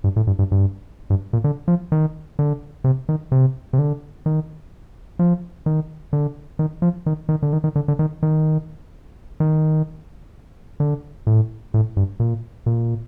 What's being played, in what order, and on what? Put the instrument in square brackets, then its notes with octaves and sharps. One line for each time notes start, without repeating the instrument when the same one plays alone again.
[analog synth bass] G2
A2
G2
G2
G2
G2
A#2
D3
F3
D#3
D3
C3
D#3
C3
C3
D3
D#3
F3
D#3
D3
D#3
F3
D#3
D#3
D3
D#3
D#3
D3
D3
D#3
D#3
D#3
D3
A2
A2
G2
A#2
A#2